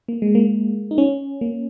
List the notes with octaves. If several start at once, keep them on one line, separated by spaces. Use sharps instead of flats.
A#3
G#3
A#3
D#4
C#4
A#3